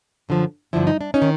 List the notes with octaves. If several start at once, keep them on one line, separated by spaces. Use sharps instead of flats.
F#2 D3 F3
G2 D3 F3 E4
D#4
D4
C#4 D#4
D#3